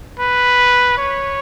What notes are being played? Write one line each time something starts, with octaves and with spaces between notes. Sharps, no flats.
B4
C#5